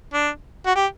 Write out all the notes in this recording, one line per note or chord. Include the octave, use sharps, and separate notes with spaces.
D4
F#4
G4